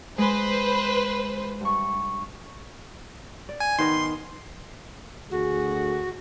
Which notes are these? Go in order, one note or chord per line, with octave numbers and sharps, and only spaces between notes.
G#3 B4 C5
G2 C#6
D5
G#5
D#3 B3 D#5 C6
D2 F#4 G#4